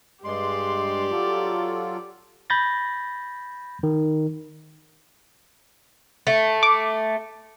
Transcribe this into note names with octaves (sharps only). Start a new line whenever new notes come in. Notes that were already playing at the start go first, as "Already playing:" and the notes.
G2 G#3 G4 D5 C6
F#3 F4 A4
B5 G6 A6 A#6
D#3
A3
D6